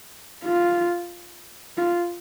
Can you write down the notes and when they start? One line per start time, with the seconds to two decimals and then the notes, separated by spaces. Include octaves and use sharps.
0.44 F4
1.78 F4